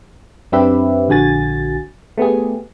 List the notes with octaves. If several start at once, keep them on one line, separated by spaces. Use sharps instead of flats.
F#2 C4 D4 G4 B4 E5
A#1 D3 F#4 G#5 A6
A3 B3 G4 G#4